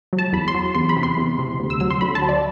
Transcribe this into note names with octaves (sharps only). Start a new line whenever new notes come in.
F#3
A5
E2 B5
C6
F#3
E2 C6
B5
C3
C6
E2
C3
D2
E6
F#3 E6
C6
D2 B5
A5
F#3
D5